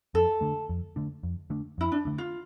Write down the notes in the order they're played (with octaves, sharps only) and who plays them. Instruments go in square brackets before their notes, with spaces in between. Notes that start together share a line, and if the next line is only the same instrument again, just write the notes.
[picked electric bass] F2 [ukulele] A4
[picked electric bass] D3 A3 D4
F2
D3 A3 D4
F2
D3 A3 D4
[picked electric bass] F2 [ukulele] E4
[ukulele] D4
[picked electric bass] D3 A3 D4
[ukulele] F4